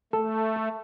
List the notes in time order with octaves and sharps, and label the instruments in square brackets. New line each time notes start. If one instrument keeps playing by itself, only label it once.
[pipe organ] A3 [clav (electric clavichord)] A4